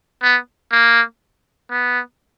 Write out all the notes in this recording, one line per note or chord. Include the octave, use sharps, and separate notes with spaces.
B3
A#3
B3